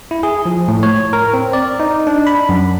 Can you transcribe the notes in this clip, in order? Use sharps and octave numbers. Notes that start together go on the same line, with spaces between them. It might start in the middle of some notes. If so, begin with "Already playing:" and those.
E4
G#4
F3
A2
C#5
A#4
C4
D5
D#4
D4
B5
F#2